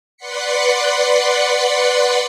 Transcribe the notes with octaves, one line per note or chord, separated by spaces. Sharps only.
B4 D5 F#5 C6 B6 C#7